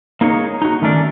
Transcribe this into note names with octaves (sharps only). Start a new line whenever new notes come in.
A#3 D#4 G#4 C#5
D#4 F#4
D#3 A3 C#4 D4